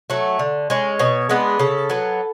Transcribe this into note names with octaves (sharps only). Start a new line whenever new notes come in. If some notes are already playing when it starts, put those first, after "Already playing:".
F#3 A3
D3
G#3 C#4
B2 C#5
G#3 B3 D4 B4
C#3 A4
F#3 B3